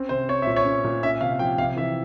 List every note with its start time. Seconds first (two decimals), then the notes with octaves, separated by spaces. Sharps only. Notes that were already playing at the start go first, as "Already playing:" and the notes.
Already playing: C4 C#4
0.09 C3 C5
0.29 C4 C#5
0.42 A#2 E5
0.56 C#5
0.65 C#4
0.84 A#2
1.03 C#4 E5
1.21 C3 F5
1.39 F3 G5
1.58 C3 F5
1.77 E3 E5